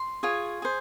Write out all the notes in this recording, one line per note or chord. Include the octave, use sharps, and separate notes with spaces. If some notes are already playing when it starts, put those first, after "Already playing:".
Already playing: C6
F4 G#4 C#5
G#4 C5